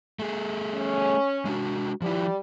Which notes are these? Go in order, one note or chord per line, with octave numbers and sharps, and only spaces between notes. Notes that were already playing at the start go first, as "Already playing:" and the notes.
A3 G#4
C#4
G#3 D4 F#4
F3 G3 E4